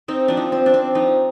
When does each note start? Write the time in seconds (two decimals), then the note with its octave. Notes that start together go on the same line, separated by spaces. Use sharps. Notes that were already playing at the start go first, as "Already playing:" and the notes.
0.08 C4 D#4
0.28 F3 D4
0.37 D#4
0.52 C4
0.66 D4
0.74 C4
0.95 F3 D#4